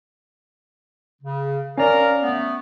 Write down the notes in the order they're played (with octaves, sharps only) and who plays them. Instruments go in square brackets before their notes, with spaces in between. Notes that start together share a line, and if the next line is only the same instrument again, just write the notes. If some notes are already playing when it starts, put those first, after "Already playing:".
[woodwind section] C#3
[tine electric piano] C#4 D5 [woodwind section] A#4 F5 A#5
[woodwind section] A3 B3